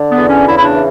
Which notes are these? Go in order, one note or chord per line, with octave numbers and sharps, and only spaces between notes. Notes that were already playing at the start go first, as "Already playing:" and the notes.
Already playing: D3
B3
E2
C#4
C#3 E4
E4
D4
E3